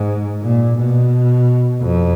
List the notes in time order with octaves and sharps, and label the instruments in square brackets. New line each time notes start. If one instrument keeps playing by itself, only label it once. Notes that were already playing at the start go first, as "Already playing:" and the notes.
Already playing: [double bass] G#2
A#2
B2
F2